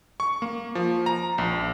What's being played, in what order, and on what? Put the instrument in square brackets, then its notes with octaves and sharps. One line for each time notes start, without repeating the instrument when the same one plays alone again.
[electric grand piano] C#6
A#3
F3
A#5
A#1